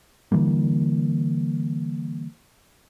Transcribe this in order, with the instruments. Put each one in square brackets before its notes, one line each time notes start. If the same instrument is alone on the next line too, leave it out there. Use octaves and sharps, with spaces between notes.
[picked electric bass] D3 E3 G3 A#3